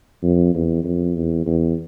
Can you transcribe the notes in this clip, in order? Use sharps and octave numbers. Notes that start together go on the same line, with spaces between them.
F2
E2
F2
E2
E2